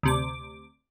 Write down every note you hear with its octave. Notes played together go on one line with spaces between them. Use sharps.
D2 C3 D6